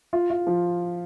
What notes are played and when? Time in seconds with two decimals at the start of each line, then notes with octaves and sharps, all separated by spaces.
0.13 F4
0.30 F4
0.47 F3